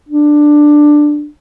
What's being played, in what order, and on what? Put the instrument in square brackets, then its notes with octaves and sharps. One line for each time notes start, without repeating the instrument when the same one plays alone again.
[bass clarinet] D4